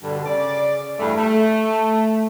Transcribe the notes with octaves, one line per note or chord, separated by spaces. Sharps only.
G2 B2 D3
C#3 D5
E2 G2 A3
A3